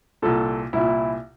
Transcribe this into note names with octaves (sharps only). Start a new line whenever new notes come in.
C2 A#2 A4
C2 A#2 E4